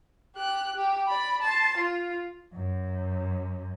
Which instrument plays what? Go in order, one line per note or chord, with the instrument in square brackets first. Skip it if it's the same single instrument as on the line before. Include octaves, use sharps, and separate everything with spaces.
[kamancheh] G4 F#6
G4
D5 B5
A5 C6
F4
[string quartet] F#2